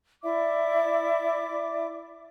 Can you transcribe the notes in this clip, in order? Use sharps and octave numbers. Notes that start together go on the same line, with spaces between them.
E4 D5 E5 D6